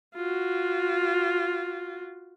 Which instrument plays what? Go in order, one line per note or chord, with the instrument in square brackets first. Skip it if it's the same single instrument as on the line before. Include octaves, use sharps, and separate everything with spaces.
[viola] F4 F#4